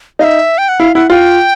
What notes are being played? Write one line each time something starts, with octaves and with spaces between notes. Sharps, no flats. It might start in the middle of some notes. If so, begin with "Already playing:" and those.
D#4 E5 F5
G5
F#5
E4 F5
E4 F#5
F4 G5